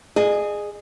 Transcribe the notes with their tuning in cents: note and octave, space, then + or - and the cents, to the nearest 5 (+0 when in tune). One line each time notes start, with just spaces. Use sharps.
G#4 +0 D#5 -45